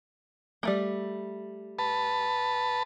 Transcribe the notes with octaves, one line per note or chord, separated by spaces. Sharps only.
G3 A3 A#3
B4 A5